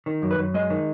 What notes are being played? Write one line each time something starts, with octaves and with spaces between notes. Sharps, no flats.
D#3
F#2
B4
F#2
G#3 D#5
D#3